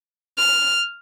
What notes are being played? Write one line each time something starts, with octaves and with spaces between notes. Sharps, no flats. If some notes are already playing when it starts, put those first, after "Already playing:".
F6